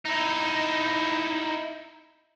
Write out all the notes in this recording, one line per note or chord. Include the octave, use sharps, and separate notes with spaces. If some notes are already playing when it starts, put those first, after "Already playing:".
D#4 E4